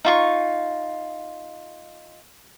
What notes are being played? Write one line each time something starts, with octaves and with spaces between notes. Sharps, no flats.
D#4 F4 C#6